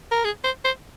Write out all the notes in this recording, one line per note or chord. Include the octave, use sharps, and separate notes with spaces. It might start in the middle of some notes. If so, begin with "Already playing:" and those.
A#4
G#4
C5
C5